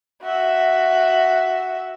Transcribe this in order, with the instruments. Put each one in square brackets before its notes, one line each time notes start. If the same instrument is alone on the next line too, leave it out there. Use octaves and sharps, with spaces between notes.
[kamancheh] F#4 E5